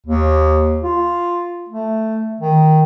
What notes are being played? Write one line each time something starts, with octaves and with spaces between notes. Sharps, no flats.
D#2
F4
A3
D#3